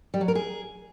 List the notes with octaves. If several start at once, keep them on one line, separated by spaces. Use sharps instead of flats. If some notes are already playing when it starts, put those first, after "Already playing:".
G3
F#3
A#4
G#4